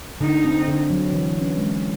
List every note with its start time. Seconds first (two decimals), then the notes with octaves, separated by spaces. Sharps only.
0.21 D3 D#4
0.44 C4
0.67 D3
0.90 F#3
1.12 E3
1.35 C#4
1.58 G#3